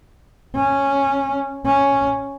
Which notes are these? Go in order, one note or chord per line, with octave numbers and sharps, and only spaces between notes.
C#4
C#4